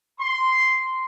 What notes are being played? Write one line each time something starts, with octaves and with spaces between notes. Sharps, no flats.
C6